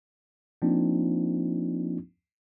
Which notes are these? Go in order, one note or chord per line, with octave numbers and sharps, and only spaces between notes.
F3 A#3 C4 D4 D#4 F4